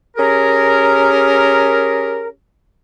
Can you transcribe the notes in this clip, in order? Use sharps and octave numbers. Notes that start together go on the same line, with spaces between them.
C#4 G4 G#4 A#4